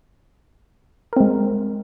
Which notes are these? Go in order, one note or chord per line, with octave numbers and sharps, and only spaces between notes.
G#3 C4 A#4